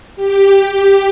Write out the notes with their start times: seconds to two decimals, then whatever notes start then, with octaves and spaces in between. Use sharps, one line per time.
0.16 G4
0.57 G4